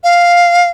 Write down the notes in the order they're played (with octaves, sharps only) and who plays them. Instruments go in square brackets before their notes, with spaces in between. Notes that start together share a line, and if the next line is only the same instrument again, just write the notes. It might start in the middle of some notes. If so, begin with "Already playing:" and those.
[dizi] F5